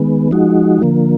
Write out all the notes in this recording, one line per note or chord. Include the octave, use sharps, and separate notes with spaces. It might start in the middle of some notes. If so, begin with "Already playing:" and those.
Already playing: D#3 G#3 B3
F3 G#3 D#4 F#4
D3 F3 A#3